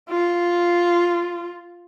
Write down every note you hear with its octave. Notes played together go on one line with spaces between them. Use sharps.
F4